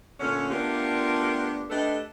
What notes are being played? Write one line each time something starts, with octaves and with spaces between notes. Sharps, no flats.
A#2 D3 A3 C#4
A3 B3 D4 F4 G4 A#4
A3 D4 G4 A4 B4 D#5